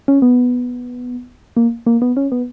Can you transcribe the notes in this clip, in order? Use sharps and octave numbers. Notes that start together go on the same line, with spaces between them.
C#4
B3
A#3
A#3
B3
C#4
B3